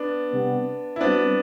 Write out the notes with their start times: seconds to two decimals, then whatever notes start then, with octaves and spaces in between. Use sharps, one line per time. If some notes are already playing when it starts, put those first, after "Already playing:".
Already playing: B3 D4
0.30 C3 G3 B3
0.96 E4
1.00 G3 B3 C4 D4 F#4 C5